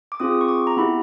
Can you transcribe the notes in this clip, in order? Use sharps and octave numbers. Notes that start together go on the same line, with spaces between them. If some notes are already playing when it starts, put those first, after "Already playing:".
D6
C4 F4 G#4 D#6
C#6
D6
A#5
B3 E4 G4 B5